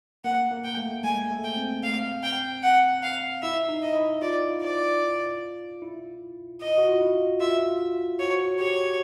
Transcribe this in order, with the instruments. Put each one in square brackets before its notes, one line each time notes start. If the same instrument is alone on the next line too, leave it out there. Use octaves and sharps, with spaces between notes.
[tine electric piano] A#3 [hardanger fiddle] F#5
[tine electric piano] A#3
[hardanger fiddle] G5
[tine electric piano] A3
[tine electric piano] G#3 [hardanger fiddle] G#5
[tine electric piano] A3
[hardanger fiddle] G5
[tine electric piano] C4
[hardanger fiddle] F5
G5
F#5
F5
[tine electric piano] E4 [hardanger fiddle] E5
[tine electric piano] D#4
[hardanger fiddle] D#5
[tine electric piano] E4
[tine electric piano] F4 [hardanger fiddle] D5
[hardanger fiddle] D5
[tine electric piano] E4
[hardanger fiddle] D#5
[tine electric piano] F#4
F4
E4
[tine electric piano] F4 [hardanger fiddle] E5
[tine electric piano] F#4 [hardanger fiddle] C#5
[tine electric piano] G4 [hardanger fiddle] C#5